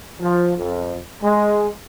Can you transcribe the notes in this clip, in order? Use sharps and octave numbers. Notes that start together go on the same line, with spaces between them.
F3
F2
G#3